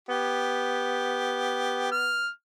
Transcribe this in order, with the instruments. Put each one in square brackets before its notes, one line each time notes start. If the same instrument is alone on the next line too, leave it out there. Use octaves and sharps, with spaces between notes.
[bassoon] B3 [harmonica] G4
[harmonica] F6